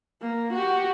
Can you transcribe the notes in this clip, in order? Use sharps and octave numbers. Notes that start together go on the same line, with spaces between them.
A#3
F#4 G4